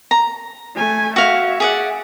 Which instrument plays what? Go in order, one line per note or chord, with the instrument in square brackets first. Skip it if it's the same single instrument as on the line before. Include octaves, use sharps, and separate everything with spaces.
[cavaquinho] A#5
[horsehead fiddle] A3 G#5
[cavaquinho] F#4 F5 [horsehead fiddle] E5
[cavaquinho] G#4 D5 F#5